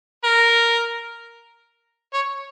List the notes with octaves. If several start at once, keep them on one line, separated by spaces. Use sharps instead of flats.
A#4
C#5